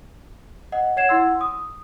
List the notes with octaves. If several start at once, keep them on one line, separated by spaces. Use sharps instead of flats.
D#5 F#5
C#5 F#5 G#6 C7 E7
E4 F#5 C6 E6
D#6